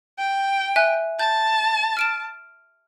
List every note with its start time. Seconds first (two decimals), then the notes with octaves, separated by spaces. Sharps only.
0.18 G5
0.76 E5 G#5 F#6
1.19 A5 G6
1.97 F6 D7 E7